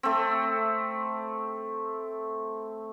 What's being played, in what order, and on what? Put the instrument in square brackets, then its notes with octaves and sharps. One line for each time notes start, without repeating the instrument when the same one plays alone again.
[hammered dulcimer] A3 C4